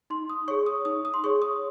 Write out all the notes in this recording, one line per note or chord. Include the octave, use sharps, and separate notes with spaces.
D#4 C6
D#6
G#4 C#5 C#6
D#6
D#4 D#6
D#6
C6
G#4 C#5 C#6
D#6